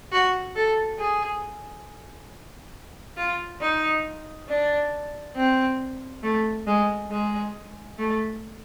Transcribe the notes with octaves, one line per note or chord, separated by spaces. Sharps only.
F#4
A4
G#4
F4
D#4
D4
C4
A3
G#3
G#3
A3